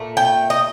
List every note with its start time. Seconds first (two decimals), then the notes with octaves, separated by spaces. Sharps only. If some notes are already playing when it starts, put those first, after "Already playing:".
Already playing: A#2 A3
0.17 G5
0.50 D#5